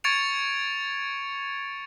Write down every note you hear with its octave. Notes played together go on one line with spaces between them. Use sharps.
C#6 G#6 A6 C#7 D7 F7